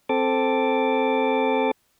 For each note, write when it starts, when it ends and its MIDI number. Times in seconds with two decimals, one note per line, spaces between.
0.09 1.71 60
0.09 1.71 69
0.09 1.71 86